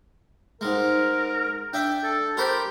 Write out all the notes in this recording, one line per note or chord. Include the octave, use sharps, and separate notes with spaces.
G#2 G#3 A#4
D4 E5 G5
A4
G4 A#4 C5 B5